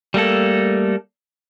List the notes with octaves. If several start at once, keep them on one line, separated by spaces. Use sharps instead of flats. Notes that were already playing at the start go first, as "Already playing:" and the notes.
G3 A3 A#3 A4